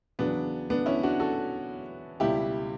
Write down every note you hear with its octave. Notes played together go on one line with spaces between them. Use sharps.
E2 C#3 F#3 B3 D4
B3 D4
C#4 E4
D4 F#4
F#4 A4
C#2 B2 G3 E4 G4